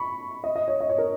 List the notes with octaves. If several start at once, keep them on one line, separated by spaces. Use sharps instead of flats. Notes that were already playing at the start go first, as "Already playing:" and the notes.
Already playing: B5 C#6
D#5
D#5
C#5
D#5
C#5
A#4